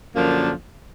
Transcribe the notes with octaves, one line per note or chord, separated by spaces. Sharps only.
F#2 D3 F3 A#3 D4